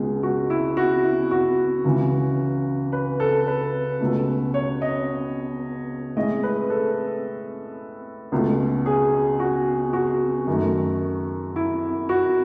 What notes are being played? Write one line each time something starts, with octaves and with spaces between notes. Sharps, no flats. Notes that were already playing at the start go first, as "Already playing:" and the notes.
Already playing: C#2 B2 G#3
F#4
E4
F#4
E4
F#4
C#2 C#3 E3
B4
A4
B4
C#2 B2 A3
C#5
D#5
A2 G#3 D#5
B4
A4
C#2 B2 A3
G#4
F#4
F#4
F#2 D#3 A3
E4
F#4